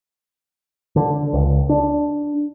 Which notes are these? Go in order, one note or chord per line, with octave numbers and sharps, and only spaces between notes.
D3
C#2
D4